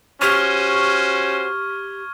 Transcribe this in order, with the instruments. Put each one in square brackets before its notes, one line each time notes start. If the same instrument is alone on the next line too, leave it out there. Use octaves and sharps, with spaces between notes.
[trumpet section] C#4 F#4 C5 [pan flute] G4 [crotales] C#6 F6 G#6